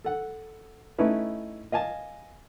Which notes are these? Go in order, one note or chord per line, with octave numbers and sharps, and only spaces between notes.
A4 F#5
A3 C#4 D#4 E4 B4
D#5 F5 G#5 A5